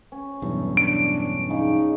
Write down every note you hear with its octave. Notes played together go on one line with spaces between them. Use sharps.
C#4
B1 E2 G2
D4 D7
C#3 D#4